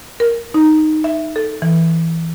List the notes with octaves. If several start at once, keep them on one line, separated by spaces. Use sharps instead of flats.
A#4
D#4
E5
A4
E3